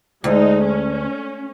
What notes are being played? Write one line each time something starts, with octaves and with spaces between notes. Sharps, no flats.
D2 G#3 D#4
C#4